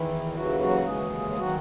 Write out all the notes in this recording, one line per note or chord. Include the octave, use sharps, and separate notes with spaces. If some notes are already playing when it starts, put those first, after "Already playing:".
Already playing: E2 D#3 E3 E4
D#2 C#3 E3 F#3 F#4
F#3 F#4
D#2 C#3 E3 G#3 G#4
D#3 F#3 F#4